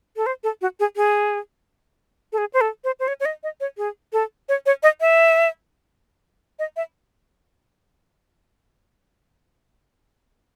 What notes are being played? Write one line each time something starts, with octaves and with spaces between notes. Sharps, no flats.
A4
C5
A4
F#4
G#4
G#4
A4
G#4
C5
A4
C5
C5
C#5
C#5
D#5
D#5
C#5
G#4
A4
C#5
C#5
D#5
E5
D#5
E5